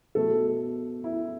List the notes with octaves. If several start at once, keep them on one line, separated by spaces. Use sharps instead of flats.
B2 A3 A4
E4